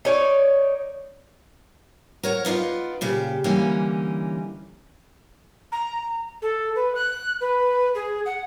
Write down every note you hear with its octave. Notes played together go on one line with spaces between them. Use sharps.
D#4 C#5 D5
A#4 C#5 F#5
B3 D#4 F4 D5
A#2 C#3 G4
D3 E3 G3 A#3 C#4 D#4
A#5
A4
B4
F#6
B4
G#4
F#5